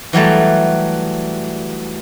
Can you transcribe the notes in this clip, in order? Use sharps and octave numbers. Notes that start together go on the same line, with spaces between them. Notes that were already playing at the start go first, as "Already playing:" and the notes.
E3 F#3 G3 A3